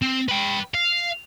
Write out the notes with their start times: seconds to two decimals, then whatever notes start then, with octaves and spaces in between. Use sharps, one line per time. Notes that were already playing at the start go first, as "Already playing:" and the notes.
0.02 C4
0.29 B4 G5
0.74 F5